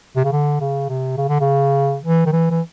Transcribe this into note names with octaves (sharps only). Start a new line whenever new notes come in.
C3
C#3
D3
C#3
C3
C#3
D3
C#3
E3
D#3
E3
E3